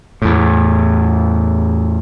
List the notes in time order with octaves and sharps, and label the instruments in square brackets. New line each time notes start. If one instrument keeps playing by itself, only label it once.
[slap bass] E2 A2